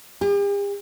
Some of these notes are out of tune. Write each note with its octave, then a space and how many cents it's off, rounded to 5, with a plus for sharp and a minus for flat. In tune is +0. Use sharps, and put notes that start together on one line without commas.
G4 +45